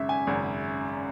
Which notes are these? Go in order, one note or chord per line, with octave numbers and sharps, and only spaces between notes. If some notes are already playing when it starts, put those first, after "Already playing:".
Already playing: G#1 F#2 C#3 E5
G#5
G#1 F#2 C#3